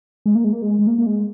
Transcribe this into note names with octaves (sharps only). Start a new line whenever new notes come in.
G#3
A#3
G#3
A#3
G#3
G#3
A#3
A#3
G#3